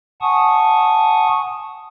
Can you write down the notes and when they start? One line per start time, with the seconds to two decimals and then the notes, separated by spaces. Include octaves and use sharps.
0.21 F#5 G#5 A5 C#6 D#6